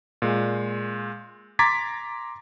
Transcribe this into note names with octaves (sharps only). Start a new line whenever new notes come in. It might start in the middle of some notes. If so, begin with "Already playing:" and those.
A#2 G#3
A#5 C6 D6 G#6 A6 B6